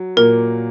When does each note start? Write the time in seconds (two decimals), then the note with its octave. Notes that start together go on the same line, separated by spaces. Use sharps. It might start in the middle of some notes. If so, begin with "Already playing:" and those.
Already playing: F#3
0.17 A#2 A#3 A#4